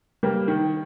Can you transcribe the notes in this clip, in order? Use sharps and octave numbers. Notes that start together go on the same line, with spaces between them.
G3 A#3
D#3